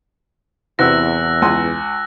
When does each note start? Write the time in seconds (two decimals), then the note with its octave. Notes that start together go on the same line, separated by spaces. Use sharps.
0.79 E2 C3 E4 F#4 E6 F#6 A#6
1.42 C#2 G#5 C6